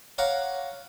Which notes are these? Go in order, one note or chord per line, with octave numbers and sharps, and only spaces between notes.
C#5 F5 F#5 A#5 D6